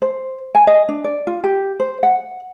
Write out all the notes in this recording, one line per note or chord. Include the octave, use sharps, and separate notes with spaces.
C5
G#5
D#5
D4
D5
F4
G4
C5
F#5